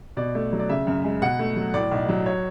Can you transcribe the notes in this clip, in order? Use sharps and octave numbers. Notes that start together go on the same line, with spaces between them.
B2 D5
A3
F#3
D5
C#3 E5
F#2
G#3
B2 F#5
A3
F#3
A2 D5
B1
F#3
C#5